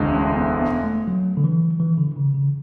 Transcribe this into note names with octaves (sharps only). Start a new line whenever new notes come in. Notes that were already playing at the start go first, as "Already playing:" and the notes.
Already playing: E1 D2 D3 G#3
C#4
B3
B3
A3
F#3
D3
E3
E3
D3
C#3
C#3